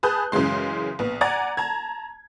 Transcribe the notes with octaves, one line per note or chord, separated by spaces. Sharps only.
G#4 B4 A5 D#6 F#6 G6
F#2 C#3 E3 G#3 C6
A#1 B3
D5 F#5 G#5 A#5 G#6 A6
A5 A#5 G#6